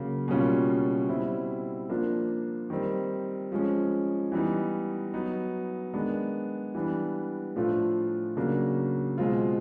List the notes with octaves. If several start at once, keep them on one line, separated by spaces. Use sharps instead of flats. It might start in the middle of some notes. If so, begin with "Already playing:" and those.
Already playing: C#3 F#3 A#3
B2 G3 A#3 C#4 F4
B2 G3 C4 E4
F3 A#3 D4 F4
D#3 G3 C4
F3 G#3 C#4
E3 G3 B3 D#4
F#3 B3 D#4
D#3 G#3 B3 D4
E3 G3 B3 D4
A2 F3 A3 D4 F4
C#3 F#3 A#3 D4
B2 G#3 C4 F4